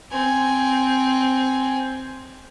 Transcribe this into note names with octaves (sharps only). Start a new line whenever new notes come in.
C4 G#5